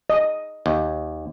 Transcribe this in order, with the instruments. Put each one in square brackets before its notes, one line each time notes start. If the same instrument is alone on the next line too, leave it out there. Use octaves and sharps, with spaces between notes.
[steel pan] D#5
[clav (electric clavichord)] D#2